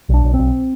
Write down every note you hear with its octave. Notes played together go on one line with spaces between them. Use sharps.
B1 D4
B1
C4
B1